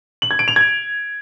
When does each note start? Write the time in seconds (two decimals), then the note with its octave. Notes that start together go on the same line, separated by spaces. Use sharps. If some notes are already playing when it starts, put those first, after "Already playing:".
0.22 F#7
0.31 G#6
0.39 D7
0.48 F7
0.56 G#6